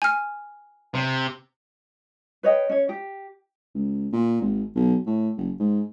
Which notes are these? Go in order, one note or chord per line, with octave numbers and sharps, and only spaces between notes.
G#5 F6
C3
B4 C#5 D#5 G5
C#4 C#5
G4
C#2
A#2
G#1
B1
A2
F#1
G#2